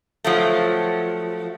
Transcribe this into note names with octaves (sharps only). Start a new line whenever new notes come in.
F3 F#3 A3